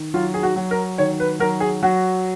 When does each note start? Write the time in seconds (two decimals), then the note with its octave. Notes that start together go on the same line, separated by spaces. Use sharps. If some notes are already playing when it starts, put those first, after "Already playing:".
Already playing: D#3
0.14 F#3 F4
0.34 G#4
0.43 F#4
0.56 F#3
0.71 A#4
0.98 D#3 C#5
1.20 B4
1.39 F#3 A#4
1.60 G#4
1.83 F#3 F#4